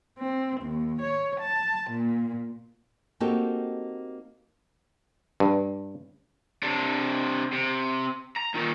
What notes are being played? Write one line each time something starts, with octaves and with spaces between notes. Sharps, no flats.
C4
D#2
C#5
A5
A#2
A#3 C4 D#4 F#4 G4 A4
G2
C3 D4
C3
A#5
A#2 D#3